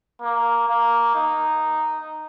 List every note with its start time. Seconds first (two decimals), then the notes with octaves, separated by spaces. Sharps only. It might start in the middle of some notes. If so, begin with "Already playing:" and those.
0.22 A#3
0.68 A#3
1.15 D#4